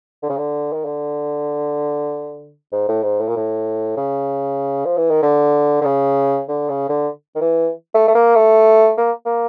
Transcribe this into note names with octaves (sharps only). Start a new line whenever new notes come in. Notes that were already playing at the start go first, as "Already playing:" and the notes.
D3
C#3
D3
D#3
D3
G#2
A2
G#2
A2
A#2
A2
C#3
F3
E3
D#3
D3
D3
C#3
D3
C#3
D3
D#3
E3
A3
A3
A#3
A3
A#3
A#3